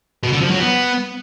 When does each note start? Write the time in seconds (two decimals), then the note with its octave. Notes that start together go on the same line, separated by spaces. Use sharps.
0.23 B2
0.32 D3
0.41 F3
0.50 F#3
0.59 B3